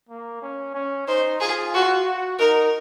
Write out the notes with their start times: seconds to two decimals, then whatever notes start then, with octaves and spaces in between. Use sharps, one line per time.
0.09 A#3
0.42 C#4
0.74 C#4
1.07 D#4 C5
1.40 F4 G#4
1.74 F#4
2.06 F#4
2.39 D#4 A#4